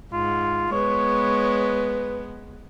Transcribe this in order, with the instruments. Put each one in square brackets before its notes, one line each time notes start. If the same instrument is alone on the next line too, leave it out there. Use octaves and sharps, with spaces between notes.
[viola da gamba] G#2 [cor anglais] F4
[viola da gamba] G#3 B3 [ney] B4 [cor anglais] C#5